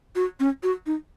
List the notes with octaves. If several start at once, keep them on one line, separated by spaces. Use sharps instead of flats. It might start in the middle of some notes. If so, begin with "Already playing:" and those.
F#4
C#4
F#4
D#4